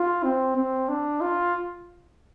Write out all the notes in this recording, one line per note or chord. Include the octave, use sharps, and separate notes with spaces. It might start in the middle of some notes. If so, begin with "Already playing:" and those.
Already playing: F4
C4
C4
D4
F4